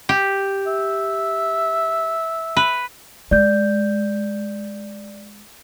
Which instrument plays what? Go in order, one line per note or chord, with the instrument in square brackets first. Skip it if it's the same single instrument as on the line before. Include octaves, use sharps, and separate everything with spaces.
[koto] G4
[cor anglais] E5
[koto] B4
[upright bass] G#3 [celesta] D5 G6